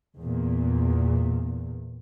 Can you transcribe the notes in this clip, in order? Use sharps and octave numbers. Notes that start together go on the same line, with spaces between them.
E2 A#2